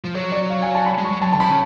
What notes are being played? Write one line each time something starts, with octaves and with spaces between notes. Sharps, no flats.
F3
F#3 C#5
D5
F5
G#5
A5
B5
G#3
C#6
F#3
F#3 A5
D3 A5
F3 B5
C#3